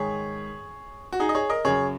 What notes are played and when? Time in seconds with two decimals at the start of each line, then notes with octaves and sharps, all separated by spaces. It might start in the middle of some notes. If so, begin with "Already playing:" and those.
Already playing: G#2 D#3 G#4 C#5
1.13 F#4
1.20 D#4 G#4
1.29 D#5
1.35 G#4 C#5
1.49 A#4 D#5
1.65 F#2 C#3 G#4 C#5